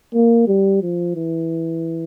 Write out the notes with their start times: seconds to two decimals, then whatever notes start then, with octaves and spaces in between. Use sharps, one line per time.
0.14 A#3
0.47 G3
0.82 F3
1.16 E3